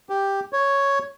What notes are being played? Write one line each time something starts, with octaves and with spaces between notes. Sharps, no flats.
G4
C#5